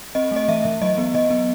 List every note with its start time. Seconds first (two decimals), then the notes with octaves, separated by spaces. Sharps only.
0.15 C4 D#5
0.31 A3 D#5
0.48 E3 E5
0.65 E3
0.81 F#3 D#5
0.98 B3
1.14 F#3 D#5
1.30 B3